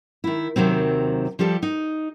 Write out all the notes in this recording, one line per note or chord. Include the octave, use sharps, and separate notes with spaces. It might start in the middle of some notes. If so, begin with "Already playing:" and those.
D#3 E4
D#2 C3 D#3 F#3 C4
F3 G3 G4 A4
D#4